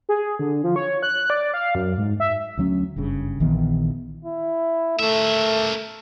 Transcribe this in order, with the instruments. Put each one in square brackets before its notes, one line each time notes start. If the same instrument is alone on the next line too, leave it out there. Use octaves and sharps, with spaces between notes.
[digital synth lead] G#4
D3
F3
C#5
F#6
D5
F5
F#2
G#2
E5
[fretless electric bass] D2 F#3 C#4
F#1 G2 C#3
A#1 D#3 E3 B3
[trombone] E4
[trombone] A3 [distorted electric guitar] A#3 E5